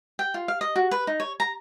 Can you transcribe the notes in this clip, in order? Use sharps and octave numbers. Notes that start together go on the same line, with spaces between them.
G5
F4
F5
D#5
F#4
B4
D#4
C#5
A#5